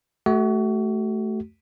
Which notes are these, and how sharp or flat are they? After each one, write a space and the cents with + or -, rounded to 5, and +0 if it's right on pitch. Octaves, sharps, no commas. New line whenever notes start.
A3 -15 F#4 +30